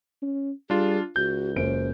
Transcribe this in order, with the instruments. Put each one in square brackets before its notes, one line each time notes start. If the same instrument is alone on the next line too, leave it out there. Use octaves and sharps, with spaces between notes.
[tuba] C#4
[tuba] G3 [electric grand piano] D4 F4 [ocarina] G#4
[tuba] C#2 [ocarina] F#4 [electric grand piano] G6
[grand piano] F#1 F#2 D7 [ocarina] C5